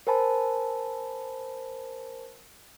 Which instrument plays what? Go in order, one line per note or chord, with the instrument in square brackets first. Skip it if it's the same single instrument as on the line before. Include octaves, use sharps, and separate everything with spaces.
[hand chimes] A#4 C5 G#5 A5 B5